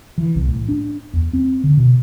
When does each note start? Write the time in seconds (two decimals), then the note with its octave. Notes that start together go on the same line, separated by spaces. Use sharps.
0.18 E3
0.35 C2
0.48 A2
0.69 D4
1.13 E2
1.33 C4
1.64 D3
1.77 B2